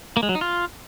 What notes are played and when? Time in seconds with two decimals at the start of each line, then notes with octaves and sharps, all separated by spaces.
0.17 A#3
0.23 G#3
0.29 F#3
0.35 D#4
0.41 F4